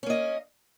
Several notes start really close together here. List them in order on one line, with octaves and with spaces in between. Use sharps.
C#4 A#3 D#5